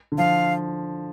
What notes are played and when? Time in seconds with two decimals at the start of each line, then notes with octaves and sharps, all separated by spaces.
0.12 D3
0.18 F3 F5